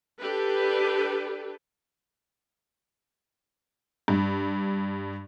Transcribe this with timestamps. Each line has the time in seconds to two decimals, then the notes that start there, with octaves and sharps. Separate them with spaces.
0.19 D4 G4 A4 B4
4.08 G2